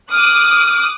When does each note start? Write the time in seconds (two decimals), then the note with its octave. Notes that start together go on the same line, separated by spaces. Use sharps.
0.11 D6 D#6 F6 F#6